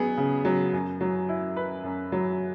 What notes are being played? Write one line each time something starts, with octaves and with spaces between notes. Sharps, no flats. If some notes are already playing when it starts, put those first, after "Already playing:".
Already playing: F#3 B3 G#4
C#3
F#3
F#2
F#3
E4
B4
F#2
F#3